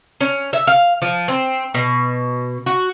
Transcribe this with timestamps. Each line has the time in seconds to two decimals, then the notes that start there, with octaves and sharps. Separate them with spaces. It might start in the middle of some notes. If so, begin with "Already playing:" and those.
0.21 C#4
0.53 E5
0.67 F5
1.02 F3
1.28 C4
1.74 B2
2.66 F#4